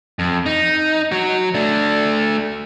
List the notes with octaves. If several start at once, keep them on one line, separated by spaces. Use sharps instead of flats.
F2
D#4
F#3 F#4
A3 D4